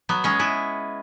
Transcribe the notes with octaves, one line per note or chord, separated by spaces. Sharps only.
F#3 B3
G#3 C#4
B3 E4